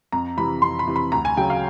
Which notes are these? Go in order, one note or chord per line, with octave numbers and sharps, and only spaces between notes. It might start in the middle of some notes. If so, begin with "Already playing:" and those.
F2 A#5
C3 E3 B5
F2 C6
B5
C3 E3
B5
D2 A#5
G#5
C#3 F#3 G5
F5